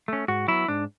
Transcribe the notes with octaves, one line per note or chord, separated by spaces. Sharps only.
A3 C#4
G#2 F#4
F#3 B3 E4
G#2 D4